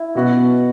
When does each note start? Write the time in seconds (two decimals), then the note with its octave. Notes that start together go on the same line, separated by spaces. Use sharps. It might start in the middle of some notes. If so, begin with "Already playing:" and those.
Already playing: E4
0.15 B2 B3 F#4